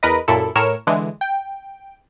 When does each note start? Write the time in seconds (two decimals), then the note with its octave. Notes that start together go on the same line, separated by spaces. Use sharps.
0.03 E2 A#4 B4 D#5
0.28 F#2 A#2 E4 A4
0.55 A2 A#4 C#5 E7
0.87 D3 E3 G#3
1.21 G5